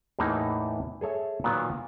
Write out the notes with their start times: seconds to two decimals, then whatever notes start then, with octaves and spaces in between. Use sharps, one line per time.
0.19 E2 A2 E3 A#3 D#4
1.01 G#4 A4 C#5 E5
1.44 A#2 D#3 F#3 B3